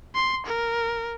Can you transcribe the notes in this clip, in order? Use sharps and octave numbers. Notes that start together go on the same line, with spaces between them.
C6
A#4